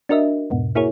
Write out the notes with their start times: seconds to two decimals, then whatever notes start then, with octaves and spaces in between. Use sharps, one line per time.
0.09 D4 F#4 A#4 D#5 E5
0.50 E2 G#2 B2
0.75 A#3 E4 F#4 G#4 A#4 C#5